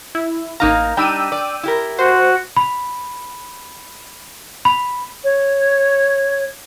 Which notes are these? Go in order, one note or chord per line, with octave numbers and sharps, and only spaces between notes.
E4
A1 A#3 D#4 F5 A#5
G3 D4 D#4 G5 E6 D#7
D5
E4 G4 A#4
F#4 C5
B5
B5
C#5